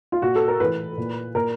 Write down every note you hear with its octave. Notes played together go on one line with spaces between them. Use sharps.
F4
A#2 F#4
A4
A#4
A2 E3 B4
A#2
A#2 A#4